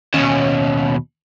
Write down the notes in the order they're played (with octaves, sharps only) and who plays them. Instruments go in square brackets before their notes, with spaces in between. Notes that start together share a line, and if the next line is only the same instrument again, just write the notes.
[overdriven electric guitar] D#2 B2 [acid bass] C#4